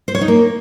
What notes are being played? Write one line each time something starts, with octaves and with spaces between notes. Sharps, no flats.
C5
C#5
D#4
A#3